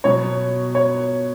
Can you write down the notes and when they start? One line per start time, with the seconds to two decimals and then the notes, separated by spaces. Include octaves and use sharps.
0.04 B2 F#3 C#5
0.75 C#5